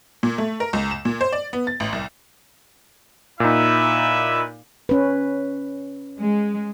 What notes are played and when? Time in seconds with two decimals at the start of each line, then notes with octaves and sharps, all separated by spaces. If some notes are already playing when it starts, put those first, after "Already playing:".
0.23 A#2
0.38 A3
0.60 A#4
0.73 C#2
0.91 E7
1.05 A#2
1.21 C5
1.33 D5
1.53 B3
1.67 A6
1.80 A1
1.93 C2
3.40 A#2 D#4 E4 B4 E5
4.89 C#4 B4
6.21 G#3